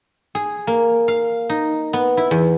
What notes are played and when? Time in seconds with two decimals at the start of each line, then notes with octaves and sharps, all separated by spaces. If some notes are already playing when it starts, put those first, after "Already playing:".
0.35 G#4
0.67 A#3
1.08 F5
1.50 D#4
1.93 B3
2.17 E4
2.31 E2